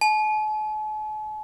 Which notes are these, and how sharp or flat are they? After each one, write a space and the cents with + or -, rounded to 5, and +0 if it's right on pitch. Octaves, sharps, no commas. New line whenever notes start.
A5 -45